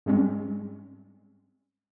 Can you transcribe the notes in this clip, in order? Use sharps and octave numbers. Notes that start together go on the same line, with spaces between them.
G#2 G3 G#3 C4 C#4